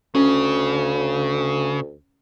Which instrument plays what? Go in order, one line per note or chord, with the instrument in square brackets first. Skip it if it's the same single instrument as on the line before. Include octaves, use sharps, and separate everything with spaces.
[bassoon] D2 [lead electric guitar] C#3 [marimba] C#4